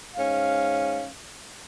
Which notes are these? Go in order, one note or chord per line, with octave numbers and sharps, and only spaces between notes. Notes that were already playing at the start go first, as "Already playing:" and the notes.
G#2 C#4 F5